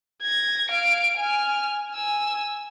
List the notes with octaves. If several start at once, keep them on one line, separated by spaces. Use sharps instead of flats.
G#6 A#6
F5 D7
G#5 F6
G#5 E6